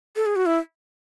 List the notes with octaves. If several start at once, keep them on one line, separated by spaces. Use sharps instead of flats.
A4
G#4
F#4
E4